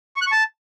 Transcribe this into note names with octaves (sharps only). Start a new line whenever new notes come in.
C#6
F#6
C#6
A5